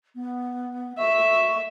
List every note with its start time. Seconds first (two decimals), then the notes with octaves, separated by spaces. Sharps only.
0.16 B3
0.98 E5 C#6